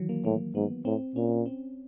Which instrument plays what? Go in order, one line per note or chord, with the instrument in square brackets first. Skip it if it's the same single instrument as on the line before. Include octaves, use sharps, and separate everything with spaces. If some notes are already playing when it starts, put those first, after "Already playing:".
Already playing: [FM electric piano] D#3 E3 F#3
A#3
[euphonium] A2 [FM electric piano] A#3
[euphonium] G#2 [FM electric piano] B3
[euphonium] A2 [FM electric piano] C4
[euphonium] A#2 [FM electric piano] C#4
[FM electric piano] C4